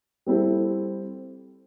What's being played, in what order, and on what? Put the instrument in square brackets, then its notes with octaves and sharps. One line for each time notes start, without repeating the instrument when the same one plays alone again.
[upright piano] G3 C4 E4 A4